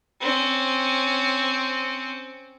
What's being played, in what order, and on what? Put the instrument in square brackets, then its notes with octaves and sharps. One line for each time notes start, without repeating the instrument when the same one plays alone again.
[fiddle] C4 C#4